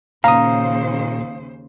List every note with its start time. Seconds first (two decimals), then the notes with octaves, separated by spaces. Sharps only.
0.24 D#2 A#2 C#3 C5 F5 A#5 D#6